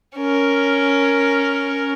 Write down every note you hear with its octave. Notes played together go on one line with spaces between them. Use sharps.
C#4 A#4